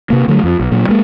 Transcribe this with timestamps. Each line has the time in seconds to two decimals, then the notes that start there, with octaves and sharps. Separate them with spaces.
0.10 C3 A#3
0.28 D3 F#3 G3 A3
0.44 F2
0.60 B1
0.72 A#2 F#3
0.89 G#3 A#3